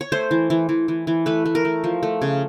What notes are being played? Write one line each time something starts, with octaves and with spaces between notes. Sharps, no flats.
C#5
A3 C5
E3
E3
E3
E3
E3
A3 B4
A3
A#4
A3
F3
A3
C#3